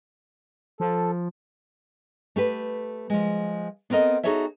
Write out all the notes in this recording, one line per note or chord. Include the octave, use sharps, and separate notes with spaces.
F3 A4
A3 G4 B4
F3 G#3
B3 C4 A4 A#4 D#5
D#4 F#4 G#4 A4 C#5 E5